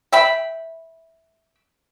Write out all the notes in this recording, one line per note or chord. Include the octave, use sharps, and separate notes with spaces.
E5 G5 B5